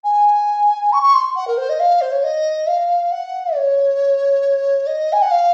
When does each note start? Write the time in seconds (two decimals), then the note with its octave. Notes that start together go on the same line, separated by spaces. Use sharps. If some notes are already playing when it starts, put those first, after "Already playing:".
0.04 G#5
0.92 C#6
1.03 C#6
1.14 C6
1.36 F#5
1.47 A#4
1.57 C5
1.69 D#5
1.79 F5
2.01 C5
2.12 C#5
2.23 D#5
2.67 F5
3.11 F#5
3.55 C#5
4.86 D#5
5.12 G#5
5.22 F#5
5.31 F5